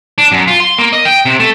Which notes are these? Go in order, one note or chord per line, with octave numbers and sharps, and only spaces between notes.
D4
F#2
F4
C6
A#3
D#5
G5
C3
A3